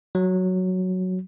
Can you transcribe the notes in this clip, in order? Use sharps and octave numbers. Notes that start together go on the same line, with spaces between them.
F#3